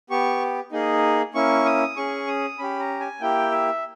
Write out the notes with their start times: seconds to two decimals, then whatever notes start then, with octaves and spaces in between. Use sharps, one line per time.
0.10 B3 G4 C#6
0.72 A#3 D#4 G#4
1.34 A#3 C#4 E4 C#6
1.65 D#6
1.96 C#4 G#4 C#6
2.27 D#6
2.58 C#4 G4 B5
2.79 A#5
3.00 G#5
3.20 A#3 E4 G4 G5
3.51 E5